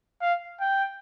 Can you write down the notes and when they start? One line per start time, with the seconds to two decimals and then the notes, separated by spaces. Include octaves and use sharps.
0.22 F5
0.61 G5